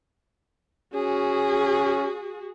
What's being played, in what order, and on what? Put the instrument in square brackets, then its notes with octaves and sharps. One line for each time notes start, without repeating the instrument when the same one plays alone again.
[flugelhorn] C#4 [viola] F#4 G#4